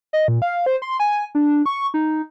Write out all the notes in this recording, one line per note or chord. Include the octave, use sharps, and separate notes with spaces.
D#5
A#2
F5
C5
C6
G#5
D4
C#6
D#4